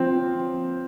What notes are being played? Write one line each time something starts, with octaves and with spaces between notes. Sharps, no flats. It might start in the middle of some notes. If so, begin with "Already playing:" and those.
Already playing: F3 C4